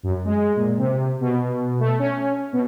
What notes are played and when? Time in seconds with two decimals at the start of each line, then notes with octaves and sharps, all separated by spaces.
0.03 F#2
0.25 G#3
0.56 A#2
0.78 C3
1.21 B2
1.80 A3
1.99 C#4
2.53 B2